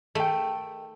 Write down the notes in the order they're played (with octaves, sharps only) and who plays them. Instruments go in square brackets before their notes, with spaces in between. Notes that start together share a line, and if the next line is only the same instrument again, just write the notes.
[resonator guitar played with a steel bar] D#3 G5 [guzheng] A3